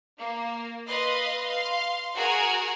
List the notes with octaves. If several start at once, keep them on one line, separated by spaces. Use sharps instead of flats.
A#3
B4 D#5 F5 C6
F5 C6
F#4 G#4 A#4 F#5 G#5